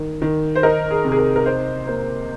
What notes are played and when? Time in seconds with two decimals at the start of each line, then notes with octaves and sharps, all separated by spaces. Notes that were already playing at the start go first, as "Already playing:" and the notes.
Already playing: D#3
0.22 D#3
0.55 C5
0.63 D#4 A#4
0.91 G#4
1.05 C3
1.12 G#4
1.18 A#4
1.36 A#4
1.46 D#4 C5
1.87 A#3 C5